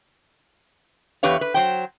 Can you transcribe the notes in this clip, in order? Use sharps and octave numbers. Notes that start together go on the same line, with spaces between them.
E2 G4 B4 C#5 F5
B4
F#3 C5 G5